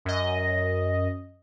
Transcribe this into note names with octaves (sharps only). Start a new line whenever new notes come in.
F#2 D#5